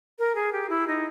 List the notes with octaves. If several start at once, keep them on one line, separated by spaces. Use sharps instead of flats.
A#4
G#4
G4
E4
D#4